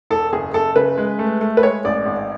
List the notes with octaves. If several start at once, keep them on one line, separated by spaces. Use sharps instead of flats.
E1 A4
F#1 G#4
F#1 A4
C#3 B4
G#3
A3
A3
B4
G#3 C#5
A1 D5
G#1